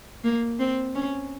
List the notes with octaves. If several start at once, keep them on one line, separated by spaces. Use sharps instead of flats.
A#3
C4
C#4